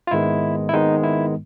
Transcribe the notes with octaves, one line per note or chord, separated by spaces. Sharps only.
F4
G#1 G#2 D#3 G#3 B3 E4
E4
G#1 G#2 D#3 G#3 B3 D#4
E4